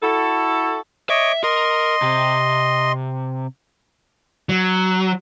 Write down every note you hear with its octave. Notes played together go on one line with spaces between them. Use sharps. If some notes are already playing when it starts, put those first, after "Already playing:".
E4 F#4 A4
C#5 D#5 E5 D6
A#4 D#5 C6
C3
F#3